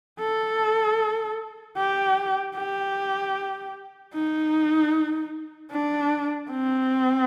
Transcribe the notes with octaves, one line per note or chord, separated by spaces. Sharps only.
A4
G4
G4
D#4
D4
C4